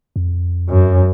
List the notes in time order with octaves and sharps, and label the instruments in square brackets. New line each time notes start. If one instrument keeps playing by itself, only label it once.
[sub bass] F2
[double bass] F#2